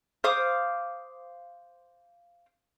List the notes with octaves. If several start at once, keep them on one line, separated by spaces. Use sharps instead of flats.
C5 F5 D6 D#6